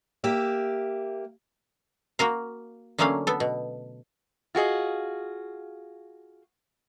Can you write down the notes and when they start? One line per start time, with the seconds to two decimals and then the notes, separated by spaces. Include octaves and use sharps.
0.24 A#3 G4 E5
2.19 A#3 F#4 A#4 F5
2.98 D3 F#3 A3 A#3 C#4 F5
3.27 B3 A4
3.40 B2
4.55 F4 F#4 G#4 D#5